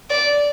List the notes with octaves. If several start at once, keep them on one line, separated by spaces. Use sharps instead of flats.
D5